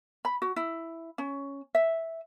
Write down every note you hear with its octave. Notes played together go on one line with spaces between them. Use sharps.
B5
F#4
E4
C#4
E5